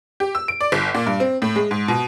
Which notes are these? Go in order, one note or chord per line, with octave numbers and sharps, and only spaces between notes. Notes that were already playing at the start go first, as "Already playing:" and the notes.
G4
E6
D7
D5
G1
A#2
G2
C4
A2
G#3
G#2
B2